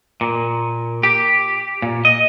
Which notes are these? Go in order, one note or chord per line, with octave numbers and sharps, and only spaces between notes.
A#2
G4
A#2
D#5